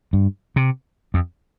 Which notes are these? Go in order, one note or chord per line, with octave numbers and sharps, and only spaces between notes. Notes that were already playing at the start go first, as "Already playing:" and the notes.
G2
C3
F2